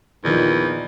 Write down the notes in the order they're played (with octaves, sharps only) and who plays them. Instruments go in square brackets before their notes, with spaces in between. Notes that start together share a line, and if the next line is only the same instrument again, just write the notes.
[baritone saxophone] E2 [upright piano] A#2 D#3 F3